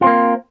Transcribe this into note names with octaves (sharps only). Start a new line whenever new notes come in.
A#3 C4 F4